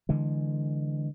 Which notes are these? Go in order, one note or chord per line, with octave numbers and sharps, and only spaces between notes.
D3 E3 G#3